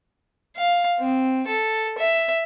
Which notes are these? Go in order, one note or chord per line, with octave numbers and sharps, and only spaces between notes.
F5
C4
A4
E5